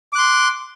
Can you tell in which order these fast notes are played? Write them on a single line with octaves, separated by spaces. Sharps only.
D6 F#6 C6